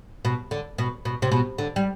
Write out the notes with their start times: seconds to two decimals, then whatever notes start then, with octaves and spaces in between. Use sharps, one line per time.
0.25 B2
0.51 D3
0.78 B2
1.05 B2
1.22 C3
1.32 B2
1.58 D3
1.76 G3